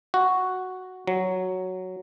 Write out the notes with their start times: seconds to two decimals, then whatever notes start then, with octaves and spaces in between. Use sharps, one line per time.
0.14 F#4
1.07 F#3